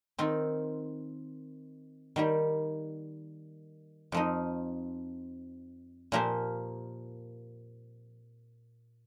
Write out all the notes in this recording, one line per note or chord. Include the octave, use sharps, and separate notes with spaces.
D#3 C4 F4
D#3 G3 A#3 G4
F2 F3 D#4
A#2 F3 A#3 G4 C5